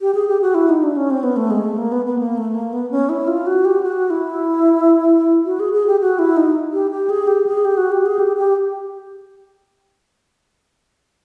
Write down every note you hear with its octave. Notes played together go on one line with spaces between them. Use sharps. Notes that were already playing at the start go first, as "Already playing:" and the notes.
G4
G#4
G4
F#4
E4
D#4
D4
C#4
C4
B3
A3
G#3
A3
A#3
B3
B3
A#3
A3
A#3
B3
C#4
E4
F4
F#4
G4
F#4
E4
F#4
G#4
G#4
G4
F#4
E4
D#4
G4
G4
G#4
G4
G#4
G4
F#4
G4
G#4
G4
G4